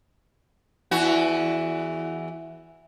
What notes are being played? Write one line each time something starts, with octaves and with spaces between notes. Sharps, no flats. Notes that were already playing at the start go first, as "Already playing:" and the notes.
E2 E3 F#4